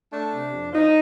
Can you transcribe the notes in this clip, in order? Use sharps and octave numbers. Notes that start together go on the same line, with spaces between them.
A3 D4
C3
F2
F3 D#4